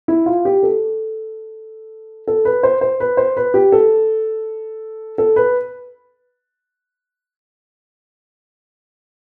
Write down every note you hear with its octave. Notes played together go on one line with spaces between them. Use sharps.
E4
F4
G4
A4
A4
B4
C5
C5
B4
C5
B4
G4
A4
A4
B4